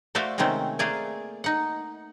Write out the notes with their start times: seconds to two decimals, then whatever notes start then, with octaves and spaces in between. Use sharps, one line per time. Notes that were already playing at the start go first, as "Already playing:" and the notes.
0.15 A3 F#4 C5 D5 E5 F5
0.38 C3 D#3 G#3 A3 C4 C#4
0.79 A3 A#3 G#4 D5 F5 G#5
1.44 D#4 F#5